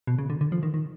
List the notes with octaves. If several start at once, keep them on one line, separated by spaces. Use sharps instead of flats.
B2
C#3
D3
D3
F3
D#3
D#3